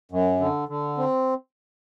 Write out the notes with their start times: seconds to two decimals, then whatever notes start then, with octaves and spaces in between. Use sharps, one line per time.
0.12 F#2
0.40 D3
0.69 D3
0.98 C4